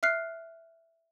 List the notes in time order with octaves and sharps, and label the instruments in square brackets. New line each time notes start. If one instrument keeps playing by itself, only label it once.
[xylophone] E5 F6 F#6 C7